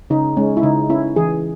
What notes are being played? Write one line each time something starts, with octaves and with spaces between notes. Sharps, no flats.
C#3 D#4
G#3 C#4
E4
C#3 D#4
C#4 E4
E3 G#4